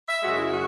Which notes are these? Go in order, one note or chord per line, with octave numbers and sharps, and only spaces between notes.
E5
F#2 C#3 G#3 F#4
E4
F#4